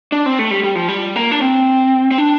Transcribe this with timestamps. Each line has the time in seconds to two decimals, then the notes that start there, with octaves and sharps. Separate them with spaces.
0.12 D4
0.26 C4
0.39 A3
0.51 G3
0.64 G3
0.75 F3
0.88 G3
1.16 A#3
1.31 D4
1.41 C4
2.11 C4
2.18 D4